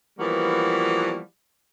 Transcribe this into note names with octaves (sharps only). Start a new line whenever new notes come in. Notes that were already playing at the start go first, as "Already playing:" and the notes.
E3 F3 G3 A#3 B3 F#4